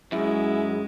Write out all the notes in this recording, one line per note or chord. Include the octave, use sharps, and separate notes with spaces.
F#2 G#3 E4 G#4